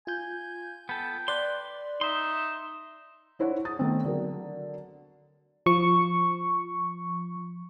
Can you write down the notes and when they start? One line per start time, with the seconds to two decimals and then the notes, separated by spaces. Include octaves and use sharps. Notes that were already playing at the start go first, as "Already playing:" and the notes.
0.07 F4 G#5 G6
0.89 B3 A4 G5
1.28 B4 D5 C6
2.01 D#4 E5 C6
3.39 D4 E4 C5 C#5 F#5
3.65 D#6 A6
3.79 D#3 A3 B3 C4
4.05 D3 F#3 A#4
5.66 F3 C#6